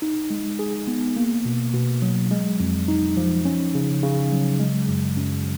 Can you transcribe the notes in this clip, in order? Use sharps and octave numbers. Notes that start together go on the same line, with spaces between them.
D#4
G#3
G#4
B3
A#3
B2
B2
F#3
G#3
F2
D#4
F3
C#4
C#3
C#3
F#3
G#3
F#2
F#2